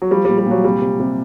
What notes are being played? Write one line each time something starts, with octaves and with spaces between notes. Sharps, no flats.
F#3
F3 G3
A#2 G3
G3
A#2 F#3
C3 G3
C3
C3